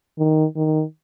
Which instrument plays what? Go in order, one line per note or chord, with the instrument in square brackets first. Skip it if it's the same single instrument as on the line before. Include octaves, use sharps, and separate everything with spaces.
[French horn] D#3
D#3